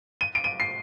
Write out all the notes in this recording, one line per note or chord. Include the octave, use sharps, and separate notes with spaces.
D#7
D7
D#7
C7